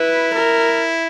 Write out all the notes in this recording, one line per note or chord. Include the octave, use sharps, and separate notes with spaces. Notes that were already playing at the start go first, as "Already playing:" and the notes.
Already playing: E4 B4
A#4